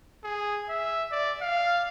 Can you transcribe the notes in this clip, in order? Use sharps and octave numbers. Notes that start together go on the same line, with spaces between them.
G#4
E5
D5
F5